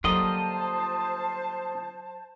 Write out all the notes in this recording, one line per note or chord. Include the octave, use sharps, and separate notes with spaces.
D3 F#3 G3 A#3 F4 C5 D#5 A5